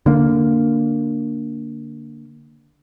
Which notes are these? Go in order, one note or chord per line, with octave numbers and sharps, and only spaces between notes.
D3 A#3